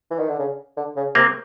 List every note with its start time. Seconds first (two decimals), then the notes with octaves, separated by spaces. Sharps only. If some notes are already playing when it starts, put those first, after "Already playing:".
0.11 E3
0.19 D#3
0.29 D3
0.39 C#3
0.77 D3
0.96 C#3
1.15 C3 A#3 C4